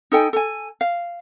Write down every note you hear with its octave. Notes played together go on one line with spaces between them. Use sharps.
D#4 A4 G5 G#5
A4 G#5
F5